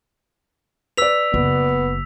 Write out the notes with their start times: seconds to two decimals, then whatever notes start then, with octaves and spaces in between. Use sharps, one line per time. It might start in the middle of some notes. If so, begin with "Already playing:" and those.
0.97 B4 D5 E6 B6 F7
1.34 F#1 B3